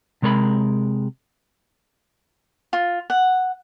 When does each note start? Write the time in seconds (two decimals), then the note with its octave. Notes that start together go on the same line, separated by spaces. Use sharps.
0.22 C3 G#3 A#4 C5 B5
2.73 F4
3.10 F#5